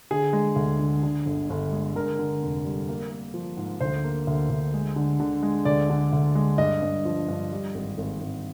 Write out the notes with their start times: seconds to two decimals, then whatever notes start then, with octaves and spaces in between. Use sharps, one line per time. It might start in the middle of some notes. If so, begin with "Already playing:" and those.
0.11 D3 G#4
0.33 G#3
0.56 D2
0.79 D3
1.03 D3
1.26 G1
1.50 G1
1.72 G#3
1.95 D3 A#4
2.19 D3
2.42 F1
2.64 G3
2.89 A#3
3.11 A#3
3.34 F3
3.57 G#2
3.80 D2 C5
4.04 A#3
4.27 D2
4.50 D2
4.73 G#3
4.96 D3
5.20 D3
5.43 G#3
5.65 D2 D5
5.90 D3
6.13 D2
6.35 G#3
6.58 G2 D#5
6.82 G2
7.05 F3
7.28 G2
7.52 G3
7.75 G#1
7.98 G#1
8.21 G#1